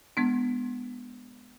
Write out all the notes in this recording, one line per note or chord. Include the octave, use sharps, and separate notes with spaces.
G#3 B3 D4